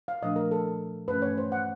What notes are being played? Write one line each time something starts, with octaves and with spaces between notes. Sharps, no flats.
F5
A#2 F3 A3 D4 D#5
A#4
A4
G2 E3 A3 C#4 B4
C#5
C5
F#5